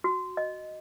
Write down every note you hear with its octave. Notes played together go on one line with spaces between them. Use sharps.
F#4
D#5